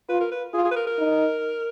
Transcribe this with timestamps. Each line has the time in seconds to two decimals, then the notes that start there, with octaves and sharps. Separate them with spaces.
0.09 F4 B4
0.20 A#4
0.31 B4
0.54 F4 G#4
0.65 G#4
0.71 B4
0.76 A#4
0.87 A#4
0.98 D#4